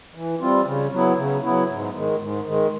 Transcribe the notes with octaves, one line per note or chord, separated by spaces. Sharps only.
E3
G3 C4 F4
C#3
F#3 B3 E4
C#3
F#3 B3 E4
G#2
D#3 G#3
G#2
D#3 G#3